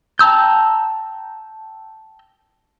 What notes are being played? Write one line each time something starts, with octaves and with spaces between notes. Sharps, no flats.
G5 A5 A#5 E6 G6